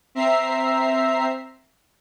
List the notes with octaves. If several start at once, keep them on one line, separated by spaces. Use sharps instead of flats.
C4 E5 A#5 C7